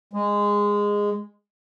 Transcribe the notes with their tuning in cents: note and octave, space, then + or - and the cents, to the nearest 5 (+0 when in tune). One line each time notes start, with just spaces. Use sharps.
G#3 -15